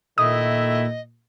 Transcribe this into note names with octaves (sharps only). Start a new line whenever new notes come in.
A#2 D#3 A3 E4 D#5 D#6